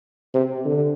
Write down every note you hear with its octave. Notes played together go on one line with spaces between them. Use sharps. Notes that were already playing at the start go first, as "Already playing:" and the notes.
C3
D3